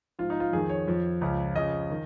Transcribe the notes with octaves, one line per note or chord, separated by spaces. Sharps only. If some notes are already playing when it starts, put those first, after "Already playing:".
G#2 F3 F4
D#4
F4
F2 D#3 G#4
C#5
F2 F3
C#2 C#3 F3
F2 C#3 F3 D#5
D#3